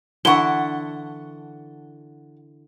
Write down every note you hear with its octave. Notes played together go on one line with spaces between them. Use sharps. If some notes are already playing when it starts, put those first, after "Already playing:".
D3 E3 E4 F#5 A5 C#6 G7